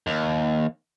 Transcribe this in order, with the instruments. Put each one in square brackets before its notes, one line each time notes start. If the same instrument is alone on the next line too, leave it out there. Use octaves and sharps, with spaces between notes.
[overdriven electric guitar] D#2